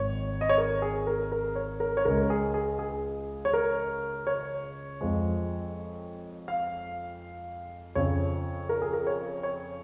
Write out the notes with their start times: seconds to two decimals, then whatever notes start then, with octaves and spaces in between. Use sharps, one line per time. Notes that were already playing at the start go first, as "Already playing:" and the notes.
Already playing: G#1 G#2 C#5
0.41 D#5
0.49 C#5
0.58 A#4
0.82 G#4
1.07 A#4
1.32 A#4
1.55 C#5
1.80 A#4
1.97 C#5
2.05 C#2 C#3 G#3 A#4
2.30 G#4
2.54 G#4
2.79 G#4
3.45 C#5
3.53 A#4
4.27 C#5
5.01 F2 F3 G#3
6.48 F5
7.95 F2 C#3 F3 C#5
8.69 A#4
8.82 G#4
8.93 A#4
9.07 C#5
9.43 C#5